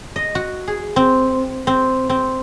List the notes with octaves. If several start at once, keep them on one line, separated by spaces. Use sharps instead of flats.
D#5
F#4
G#4
C4
C4
C4